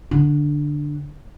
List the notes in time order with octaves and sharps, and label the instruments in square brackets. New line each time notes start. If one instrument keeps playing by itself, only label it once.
[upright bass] D3 D4